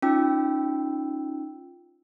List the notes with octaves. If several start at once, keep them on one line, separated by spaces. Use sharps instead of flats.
C#4 D#4 F4 G5 E6